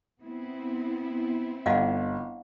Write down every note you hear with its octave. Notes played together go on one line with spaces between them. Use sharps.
B3 C4 E4
G1 D#5 F5 F#5